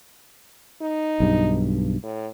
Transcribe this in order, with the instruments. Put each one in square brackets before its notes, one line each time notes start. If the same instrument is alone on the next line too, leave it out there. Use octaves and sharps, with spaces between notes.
[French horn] D#4
[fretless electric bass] B1 G2
[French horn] A2